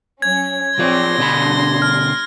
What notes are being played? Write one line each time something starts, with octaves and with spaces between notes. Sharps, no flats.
F#3 C#4 G#6
F3 C4 F4 C#5 D5 C6 A#6
B2 D3 G3 D4 B5
F6